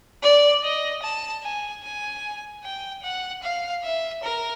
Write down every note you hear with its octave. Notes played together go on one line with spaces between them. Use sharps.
D5
D#5
A5
G#5
G#5
G5
F#5
F5
E5
A#4